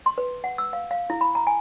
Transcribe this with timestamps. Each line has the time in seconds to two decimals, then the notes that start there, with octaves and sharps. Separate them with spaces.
0.06 C6
0.18 B4
0.44 F#5
0.58 E6
0.73 F5
0.91 F5
1.10 E4
1.21 B5
1.35 A#5
1.47 G#5